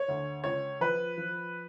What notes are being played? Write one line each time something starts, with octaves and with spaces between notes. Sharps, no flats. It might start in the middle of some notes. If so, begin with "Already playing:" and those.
Already playing: C#5
D2
C#2 C#5
F3 B4
F3